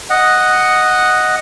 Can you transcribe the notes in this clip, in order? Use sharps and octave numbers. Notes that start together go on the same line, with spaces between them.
D#5 F#5